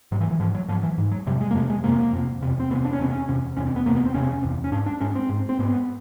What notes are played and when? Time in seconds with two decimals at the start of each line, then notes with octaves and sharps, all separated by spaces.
0.12 G#2 F#3
0.20 E3
0.31 E3
0.39 G#2 F3
0.55 F#3
0.68 G#2 F3
0.83 E3
0.98 G#2
1.11 F#3
1.26 F2 C3 G3
1.41 G#3
1.51 A#3
1.55 F2 C3 A3
1.70 G#3
1.84 F2 C3 A#3
2.13 F2 C3
2.41 E2 C3
2.60 C4
2.70 E2 C3 B3
2.84 D4
2.93 C#4
2.99 E2 C3 C4
3.09 C#4
3.29 E2 C3
3.57 E2 C3 C#4
3.66 C4
3.76 B3
3.86 E2 C3 A#3
3.95 B3
4.05 C4
4.14 E2 C3 C#4
4.43 E2 C3
4.64 C#4
4.72 G#2 D4
4.86 D4
5.01 G#2 C#4
5.15 C4
5.29 G#2
5.49 C4
5.59 G#2 B3